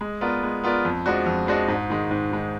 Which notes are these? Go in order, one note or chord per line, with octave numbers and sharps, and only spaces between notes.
G#3
B3 F4 A#4 D5
G#3
B3 F4 A#4 D5
F2
F3 G#3 D4 F#4
F2
F3 G#3 D4 F#4
G#2
D#3 G#3
G#2
D#3 G#3